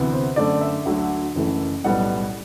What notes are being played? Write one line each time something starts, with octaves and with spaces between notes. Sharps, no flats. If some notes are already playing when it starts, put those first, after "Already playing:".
Already playing: D2 C3 E3 B3
C5
F#2 D3 A3 D5
E5
D2 D3 F#3 A3
F#1 F#2 E3 A3
B1 A2 G3 B3 F#5